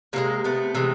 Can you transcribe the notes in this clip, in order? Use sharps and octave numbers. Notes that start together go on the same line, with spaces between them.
C3 E3 G#3 A#3
A3 B3
C3 E3 G#3